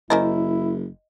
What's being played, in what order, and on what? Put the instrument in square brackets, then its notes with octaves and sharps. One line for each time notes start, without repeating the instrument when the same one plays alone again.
[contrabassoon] F#1 [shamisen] C#4 A#4 C5 [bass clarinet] E4 [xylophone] D#5